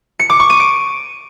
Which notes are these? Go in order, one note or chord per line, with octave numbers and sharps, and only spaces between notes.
C#7
D6
C#6
D#7
D7